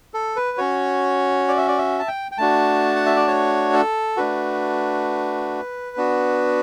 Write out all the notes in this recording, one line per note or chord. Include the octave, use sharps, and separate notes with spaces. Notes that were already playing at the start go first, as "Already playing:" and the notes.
A4
B4
C#4 F#4 C#5
D5
E5
D5
E5
A5
G5
G5
A3 D4 F#4 A5
F#5
E5
D5
C#5
A4
A3 D4 F#4 B4
B3 D4 F#4